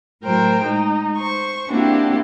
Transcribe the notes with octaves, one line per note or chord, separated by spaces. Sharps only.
A2 F#3 A#4 C5 G5
G#3 D#4
C5 C#6
A#3 C4 D4 E4 F#4 G4